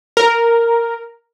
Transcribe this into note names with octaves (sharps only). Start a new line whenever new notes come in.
A#4